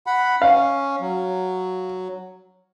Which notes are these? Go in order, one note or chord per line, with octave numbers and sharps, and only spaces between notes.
F#5 B5
C#4 F5
F#3